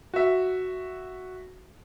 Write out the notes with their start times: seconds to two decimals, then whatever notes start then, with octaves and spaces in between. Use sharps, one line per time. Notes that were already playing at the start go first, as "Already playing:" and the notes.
0.14 F#4 E5